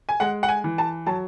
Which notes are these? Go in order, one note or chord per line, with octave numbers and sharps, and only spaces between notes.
G#5
G#3 F#5
F#5
G#5
E3
A5
F#3 A5